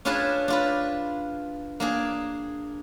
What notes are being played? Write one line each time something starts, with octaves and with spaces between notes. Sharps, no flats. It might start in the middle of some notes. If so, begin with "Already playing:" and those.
C#4 D4 F4 G#4 B4 A5
D4 F4 B4
A#3 D4 G#4